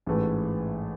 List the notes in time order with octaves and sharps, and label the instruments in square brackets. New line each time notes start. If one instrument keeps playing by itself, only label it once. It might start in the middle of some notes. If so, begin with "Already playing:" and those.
[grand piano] A1 G#2 E3 A3